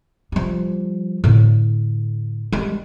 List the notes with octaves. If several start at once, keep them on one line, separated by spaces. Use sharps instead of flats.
F3 G3
A2 D3
G3 G#3